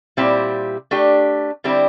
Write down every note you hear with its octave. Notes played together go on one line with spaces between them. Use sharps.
A#2 G3 C4 E4 G4
A3 D4 G4
D3 G3 C4 E4 G4